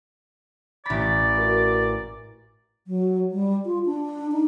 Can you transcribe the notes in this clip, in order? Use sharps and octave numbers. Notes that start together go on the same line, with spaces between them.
A1 D5 B5 A6 B6
F#4 A#4
F#3
G3
F4
D4
D#4